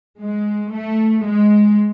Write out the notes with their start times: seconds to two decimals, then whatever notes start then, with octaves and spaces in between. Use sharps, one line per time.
0.21 G#3
0.73 A3
1.25 G#3